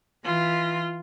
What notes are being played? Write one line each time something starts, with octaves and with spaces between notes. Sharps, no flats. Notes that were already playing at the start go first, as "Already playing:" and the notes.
E3 F4